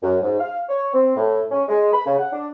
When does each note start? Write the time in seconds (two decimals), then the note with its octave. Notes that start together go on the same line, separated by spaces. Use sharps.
0.03 F#2
0.22 G#2
0.40 F5
0.69 C#5
0.94 C4
1.17 A2
1.51 C#4
1.68 G#3
1.92 B5
2.06 C#3
2.18 F#5
2.33 D4